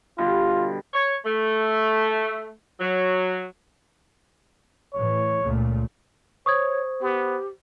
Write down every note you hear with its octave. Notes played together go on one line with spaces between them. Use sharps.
B2 D3 G3 F4
C#5
A3
F#3
A2 E3 C#5
C#2 A#2 A3
C5 C#5 C#6 D#6 G#6
B3 G4